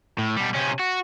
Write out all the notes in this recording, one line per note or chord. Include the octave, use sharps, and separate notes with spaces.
A2
B2 G3
C3 C#4
F#4